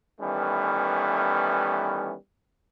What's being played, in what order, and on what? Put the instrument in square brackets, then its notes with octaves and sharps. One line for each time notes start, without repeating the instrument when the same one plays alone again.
[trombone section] D#3 E3 G3 A3 B3 C#4